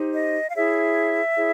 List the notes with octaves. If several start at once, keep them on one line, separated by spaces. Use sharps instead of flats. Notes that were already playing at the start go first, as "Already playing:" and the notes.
Already playing: D#4 G4 C5
D#5
F5
E4 G#4 C#5 E5
E4 G#4 C#5